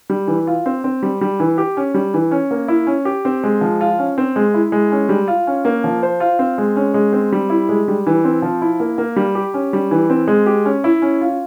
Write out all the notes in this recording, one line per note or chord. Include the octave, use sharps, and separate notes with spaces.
G3
E3
F4
C4
C4
G3
G3
E3
G4
C#4
G3
E3
C#4
A#3
E4
C#4
G4
C4
G#3
F3
F4
C#4
C4
G#3
E4
G#3
C#4
G3
F4
C#4
A#3
F3
C5
F4
C4
G#3
C#4
G#3
C4
G3
E4
G#3
G3
E3
C4
F3
E4
A#3
A#3
G3
G4
C#4
G3
E3
C4
G#3
G4
C#4
E4
C#4
F4